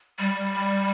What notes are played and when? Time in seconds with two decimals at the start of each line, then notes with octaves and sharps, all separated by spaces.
0.19 G3